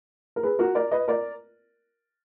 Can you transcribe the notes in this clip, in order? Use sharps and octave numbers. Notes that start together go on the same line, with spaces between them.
A#4
G#4 B4
F#4 A#4
A#4 D5
B4 D#5
A#4 D5